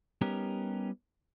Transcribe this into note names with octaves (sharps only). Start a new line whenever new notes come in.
G3 B3 C#4 D#4 G4 A#4